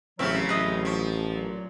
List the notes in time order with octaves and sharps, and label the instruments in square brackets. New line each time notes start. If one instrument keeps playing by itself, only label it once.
[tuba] A1 [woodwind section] E2 F#3 [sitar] C#3 F3 C4 [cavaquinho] E5 F5
[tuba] A1 [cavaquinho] B4 D#5 E5
[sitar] F3
[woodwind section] A#2 F#3